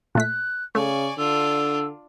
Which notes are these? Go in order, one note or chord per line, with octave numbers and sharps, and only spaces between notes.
A#2 A3 F#6 B6
C#3 A3 D5 G#5 C#6
D3 D4 F4 E6